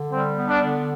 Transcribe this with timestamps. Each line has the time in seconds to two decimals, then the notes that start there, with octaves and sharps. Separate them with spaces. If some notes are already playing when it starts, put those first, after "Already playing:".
Already playing: D3
0.12 G3 C4
0.36 B3
0.48 D4
0.60 D3